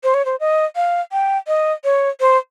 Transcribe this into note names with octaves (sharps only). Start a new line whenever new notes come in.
C5
C#5
C5
D#5
F5
G5
D#5
C#5
C5